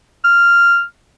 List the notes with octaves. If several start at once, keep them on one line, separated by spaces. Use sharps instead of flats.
F6